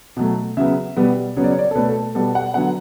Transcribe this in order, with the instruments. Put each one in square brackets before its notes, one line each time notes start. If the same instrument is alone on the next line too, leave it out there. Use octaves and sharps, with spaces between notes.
[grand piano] B2 F#3 A3
C#3 F#3 B3 E5
B2 G3 B3
C#3 F#3 B3 C#5
D5
C#5
D5
C#5
A4
B2 A3 B4
A4
B2 G3 B3 A4
F#5
D3 F#3 B3 F#5